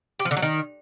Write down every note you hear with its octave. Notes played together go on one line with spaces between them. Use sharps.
G4
F3
D3
F#3
D#3